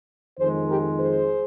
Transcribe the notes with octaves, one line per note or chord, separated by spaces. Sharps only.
F2 D#3 G#3 G#4 C5
G4 A#4
G#4 C5